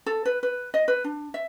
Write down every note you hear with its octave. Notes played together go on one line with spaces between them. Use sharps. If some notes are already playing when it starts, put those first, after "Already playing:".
A4
B4
B4
D#5
B4
D4
E5